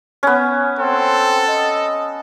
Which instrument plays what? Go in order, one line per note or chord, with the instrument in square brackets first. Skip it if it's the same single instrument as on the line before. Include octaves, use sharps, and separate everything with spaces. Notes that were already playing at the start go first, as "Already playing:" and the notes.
[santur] B3 C#4
[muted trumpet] C4 [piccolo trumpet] A4
[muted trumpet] D#5